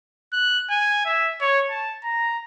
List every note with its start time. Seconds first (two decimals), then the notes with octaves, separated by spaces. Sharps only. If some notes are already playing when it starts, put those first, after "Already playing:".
0.33 F#6
0.70 G#5
1.06 E5
1.41 C#5
1.70 A5
2.03 A#5